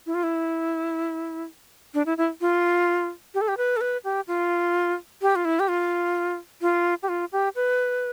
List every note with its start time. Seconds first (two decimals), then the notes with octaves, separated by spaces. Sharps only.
0.06 E4
0.14 F4
0.23 E4
1.94 D4
2.06 E4
2.18 E4
2.41 F4
3.34 G4
3.41 A4
3.48 G4
3.58 B4
3.77 A4
3.81 B4
4.04 G4
4.28 F4
5.22 G4
5.36 F4
5.45 E4
5.60 G4
5.68 F4
6.61 F4
7.03 G4
7.09 F4
7.32 G4
7.56 B4